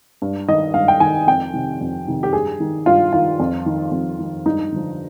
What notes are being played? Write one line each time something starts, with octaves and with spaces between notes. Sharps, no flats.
G2
D#3 D#5
G2 F5
G5
D#3 G#5
F2 G5
C3 D#3
F2
C3 D#3
G4
G2 G#4
D#3
G2 F4
D#3 F4
F2
D#3
F2
D#3
G2 D#4
D3 F3